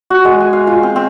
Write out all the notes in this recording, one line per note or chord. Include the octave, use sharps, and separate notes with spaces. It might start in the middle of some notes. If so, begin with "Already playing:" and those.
F#4
G#3
G#5
F5
F4
C4
C4